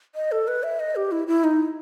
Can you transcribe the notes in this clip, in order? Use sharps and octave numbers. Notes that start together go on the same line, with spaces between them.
D#5
A4
B4
E5
D#5
G4
E4
E4
D#4